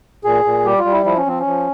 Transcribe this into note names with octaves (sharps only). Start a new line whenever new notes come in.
A#2 G#4
A#2
G3 G4
F4
G3
E4
F3 E4
C#4
F3 C4
C#4
F3